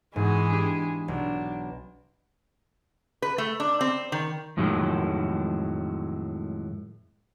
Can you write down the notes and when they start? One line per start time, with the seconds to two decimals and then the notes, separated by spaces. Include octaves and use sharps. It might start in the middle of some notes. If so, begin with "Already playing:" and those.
0.16 G#2 E3 G#3 B3 F#4 G#4
0.50 D4 G4
1.08 B1 D4
3.22 B4
3.38 A3
3.60 D4
3.81 C4
4.12 D#3
4.57 F2 A2 D#3 F#3 G#3